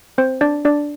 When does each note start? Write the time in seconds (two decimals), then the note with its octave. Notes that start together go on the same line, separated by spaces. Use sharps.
0.18 C4 C5
0.41 D4 D5
0.65 D4 D5